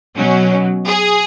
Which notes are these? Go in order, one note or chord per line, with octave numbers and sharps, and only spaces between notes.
B2 F#3 C#4
G#4